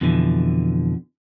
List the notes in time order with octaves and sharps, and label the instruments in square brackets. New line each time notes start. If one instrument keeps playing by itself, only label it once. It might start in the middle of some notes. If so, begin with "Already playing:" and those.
[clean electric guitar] F2 B2 D3 E3